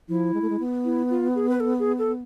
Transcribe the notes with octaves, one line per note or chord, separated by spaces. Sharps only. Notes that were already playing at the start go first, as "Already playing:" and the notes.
F3 E4
G#3
A3
G#3
B3
E4
F4
G#4
B4
A4
G#4
A4